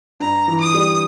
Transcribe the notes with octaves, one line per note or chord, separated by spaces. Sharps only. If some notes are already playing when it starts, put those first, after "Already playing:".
G2 A#5
E3
D#6
G3